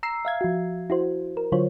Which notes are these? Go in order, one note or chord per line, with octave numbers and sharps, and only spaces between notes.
A#5 E6 C7
E5 F5 G#6
F3 F#4
E4 F#4 C5
A#4
D3 F#3 F4 C5 C#5